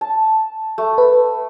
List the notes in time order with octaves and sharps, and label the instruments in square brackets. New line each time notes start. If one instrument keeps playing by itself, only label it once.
[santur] A5
A3
[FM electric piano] B4